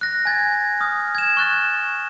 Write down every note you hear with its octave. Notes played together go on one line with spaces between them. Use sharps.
F#6 A#6
G#5 G#6 A6
D#6 F6
G#6 E7
C#6 F#6 A6